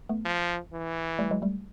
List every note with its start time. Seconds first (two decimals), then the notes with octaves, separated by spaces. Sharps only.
0.09 A3 B3
0.25 F3
0.73 E3
1.19 G3 A3
1.31 F#3 G#3
1.42 G3 A3